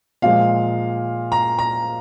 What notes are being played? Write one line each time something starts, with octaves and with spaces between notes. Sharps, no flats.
A#2 F3 G#3 F5
A#5
A#5